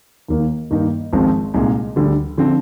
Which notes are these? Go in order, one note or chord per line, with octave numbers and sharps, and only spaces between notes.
D#2 D#3 A#3
G2 D#3 A#3 D#4
G#1 G#2 F3 G#3 C4
C2 A#2 G#3 D#4
D2 D3 G3
D3 F3 C4